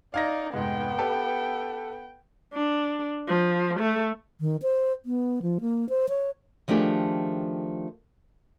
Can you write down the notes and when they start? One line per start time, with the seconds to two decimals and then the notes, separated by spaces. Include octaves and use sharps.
0.14 D#4 D5 F5 G#6 A#6
0.54 F1 G#2 B3 G5
0.98 G4 A4 B4
2.53 D4
3.28 F3
3.80 A3
4.41 D#3
4.62 C5
5.06 B3
5.42 F3
5.61 A#3
5.89 C5
6.09 C#5
6.68 D#3 F3 A3 D4 G4 G#4